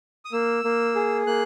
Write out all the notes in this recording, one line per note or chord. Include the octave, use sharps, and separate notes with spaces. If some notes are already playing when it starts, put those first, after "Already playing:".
D#6
A#3 E6
A#3
G#4
A#3 F#6